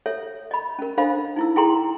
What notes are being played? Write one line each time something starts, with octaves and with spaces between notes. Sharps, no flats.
A4 C#5 E5
D#5 B5
C#4 A#4
D4 A4 C5 D#5 F5 B5
D#4 E4 E6
E4 G#4 A4 G5 A#5 C6